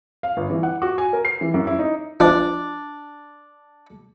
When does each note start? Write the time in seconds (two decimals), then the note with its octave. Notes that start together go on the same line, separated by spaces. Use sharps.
0.23 F5
0.37 G1
0.50 E3
0.63 F#5
0.82 F#4
0.98 G#5
1.13 A#4
1.25 C7
1.41 E3
1.54 F#2
1.67 E4
1.79 D#4
2.20 F3 D4